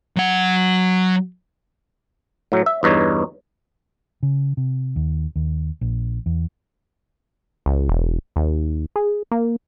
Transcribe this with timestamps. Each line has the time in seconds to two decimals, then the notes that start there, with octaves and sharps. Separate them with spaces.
0.17 F#3 F#5
2.52 A2 F#3
2.66 E5
2.83 E2 G2 D#4 C#5
4.23 C#3
4.57 C3
4.96 D#2
5.36 D#2
5.81 A#1
6.26 E2
7.66 C#2
7.89 E1
8.36 D#2
8.96 G#4
9.31 A#3